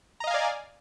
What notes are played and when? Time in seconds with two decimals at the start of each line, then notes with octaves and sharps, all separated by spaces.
0.20 A#5
0.24 D#5
0.27 F5
0.31 G#5
0.34 D5